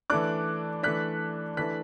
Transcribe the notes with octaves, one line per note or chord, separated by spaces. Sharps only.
E3 A3 D4 D6 F#6
E3 A3 D4 F#6 B6
E3 A3 D4 F#6 B6